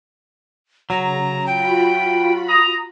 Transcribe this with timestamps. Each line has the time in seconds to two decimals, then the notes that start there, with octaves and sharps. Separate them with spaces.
0.90 C#3 F#3 A#5
1.46 F4 F#4 G5 B5
2.49 A#5 D#6